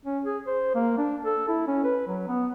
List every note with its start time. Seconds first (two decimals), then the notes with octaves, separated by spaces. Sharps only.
0.06 C#4
0.25 G#4
0.47 C5
0.75 A#3
0.98 D4
1.25 A4
1.48 E4
1.68 C#4
1.84 B4
2.07 F#3
2.27 B3